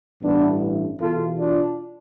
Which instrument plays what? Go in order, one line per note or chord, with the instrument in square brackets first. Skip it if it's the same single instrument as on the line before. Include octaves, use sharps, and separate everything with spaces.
[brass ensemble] A1 G2 E3 B3 D4
E2 B2 F4 A4
D4 F4